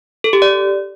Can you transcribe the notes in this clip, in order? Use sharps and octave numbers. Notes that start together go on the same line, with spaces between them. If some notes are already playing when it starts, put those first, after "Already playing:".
A4
G4
D5